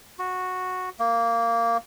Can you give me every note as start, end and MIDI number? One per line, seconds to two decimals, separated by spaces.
0.19 0.89 66
1.00 1.77 58